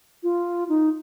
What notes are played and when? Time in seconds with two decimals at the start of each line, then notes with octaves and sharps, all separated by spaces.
0.23 F4
0.69 D#4